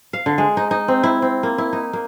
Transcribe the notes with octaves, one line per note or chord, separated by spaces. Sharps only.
F5
D3
G#3
D#4
D#4
C4
E4
C4
A#3
E4
D#4
A#3